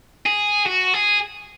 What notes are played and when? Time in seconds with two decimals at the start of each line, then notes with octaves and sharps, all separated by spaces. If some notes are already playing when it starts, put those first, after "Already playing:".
0.26 G#4
0.66 F#4
0.93 G#4